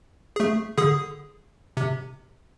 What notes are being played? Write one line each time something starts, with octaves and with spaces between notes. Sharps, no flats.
A3 G#4
D3 G#4 D#6
C3